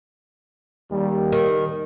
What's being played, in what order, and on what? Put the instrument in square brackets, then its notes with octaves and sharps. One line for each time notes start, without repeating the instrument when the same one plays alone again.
[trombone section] D#2 G3
[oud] D#3